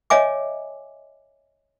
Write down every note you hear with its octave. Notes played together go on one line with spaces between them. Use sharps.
C#5 D#5 E5 G#5 D6